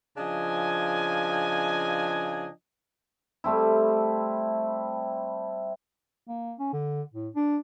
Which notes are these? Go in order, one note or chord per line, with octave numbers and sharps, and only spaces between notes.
C#3 F3 D4 D#5 G#5
G3 A3 C4 E4
A#3
C#4
D3
A2
D4